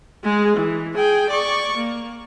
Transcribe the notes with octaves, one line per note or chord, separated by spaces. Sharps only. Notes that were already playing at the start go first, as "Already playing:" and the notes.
G#3 G#4
E3
G#4 G5
D5 C#6
A#3